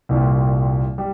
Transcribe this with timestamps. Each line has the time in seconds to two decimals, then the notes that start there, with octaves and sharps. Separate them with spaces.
0.09 C2 A#2 G3
0.98 G3